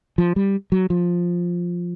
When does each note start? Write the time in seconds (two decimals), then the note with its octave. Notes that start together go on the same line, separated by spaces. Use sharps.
0.18 F3
0.36 G3
0.72 F#3
0.90 F3